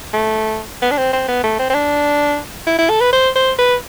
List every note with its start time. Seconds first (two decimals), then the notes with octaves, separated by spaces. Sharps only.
0.14 A3
0.82 B3
0.91 D4
0.98 C4
1.13 C4
1.28 B3
1.44 A3
1.59 C4
1.70 C4
1.74 D4
2.67 E4
2.78 E4
2.89 A4
3.01 B4
3.13 C5
3.36 C5
3.59 B4